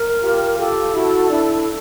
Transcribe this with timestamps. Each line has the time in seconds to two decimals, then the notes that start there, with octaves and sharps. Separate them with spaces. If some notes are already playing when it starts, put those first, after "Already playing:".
Already playing: A#4
0.22 F4 G4
0.58 F4 G4 A4
0.94 E4 F#4
1.30 D4 E4